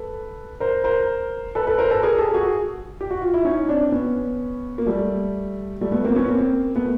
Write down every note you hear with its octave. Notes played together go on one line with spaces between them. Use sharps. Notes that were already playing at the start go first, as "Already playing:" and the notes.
Already playing: A4 B4
A#4 C5
A#4 C5
A4 B4
A4 B4
A#4 C5
A4 B4
G#4 A#4
G4 A4
F#4 G#4
G4
F#4
F4
E4
C#4 D#4
C4 D4
B3 C#4
A#3
G3 A3
G3 A3
A3 B3
A#3 C4
B3 C#4
A#3 C4
A3 B3